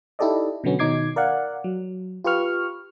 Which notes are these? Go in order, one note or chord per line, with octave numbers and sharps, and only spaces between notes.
D#4 E4 G4 A4 D5 D#5
B2 D3 F#3 B3 C#4
B2 D#3 D#4 D6 G#6 C7
A#4 D5 F5 F#5
F#3
F4 G4 B4 C#6 F6